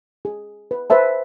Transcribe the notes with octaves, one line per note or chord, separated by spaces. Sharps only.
G#4
B4
B4 C5 E5 A5